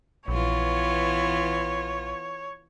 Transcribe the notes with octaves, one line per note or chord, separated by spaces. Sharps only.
A#1 E3 B3 F4 C#5